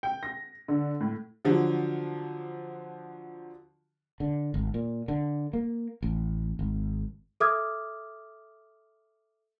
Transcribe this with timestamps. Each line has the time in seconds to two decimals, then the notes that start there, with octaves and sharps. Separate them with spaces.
0.03 G5
0.23 A#6
0.68 D3
1.01 A2
1.45 D3 F3 F#3
4.20 D3
4.54 G#1
4.74 A#2
5.08 D3
5.53 A#3
6.03 A1
6.59 G#1
7.40 A4 E5 D6 D#6 F6 G#6